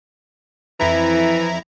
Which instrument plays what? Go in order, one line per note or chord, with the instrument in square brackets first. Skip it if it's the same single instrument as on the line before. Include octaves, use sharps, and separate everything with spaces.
[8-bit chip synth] F2 E4 A#5 [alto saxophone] E3